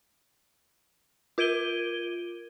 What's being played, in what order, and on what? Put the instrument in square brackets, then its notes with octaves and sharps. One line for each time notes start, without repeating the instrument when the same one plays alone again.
[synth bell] F4 A#4 G#6 D7 D#7 G7